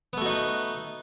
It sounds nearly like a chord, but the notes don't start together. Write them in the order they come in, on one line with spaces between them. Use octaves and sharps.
B3 A3 F#4 D#4 B4